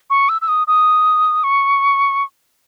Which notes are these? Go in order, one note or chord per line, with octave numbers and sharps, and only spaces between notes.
C#6
E6
E6
D#6
D#6
C#6